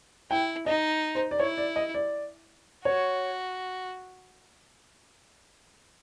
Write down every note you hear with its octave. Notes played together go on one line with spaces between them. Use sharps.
E4 G5
D#4 D#5
C5
D5
E4 C#5
D5
D#5
D5
F#4 C#5